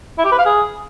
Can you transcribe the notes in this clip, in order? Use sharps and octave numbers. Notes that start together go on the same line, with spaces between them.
E4
G4
B4
F5
G#4